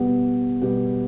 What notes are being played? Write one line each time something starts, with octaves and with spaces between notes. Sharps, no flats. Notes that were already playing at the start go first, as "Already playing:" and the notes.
Already playing: B2 G3 B3 G4
B2 G3 B3 G4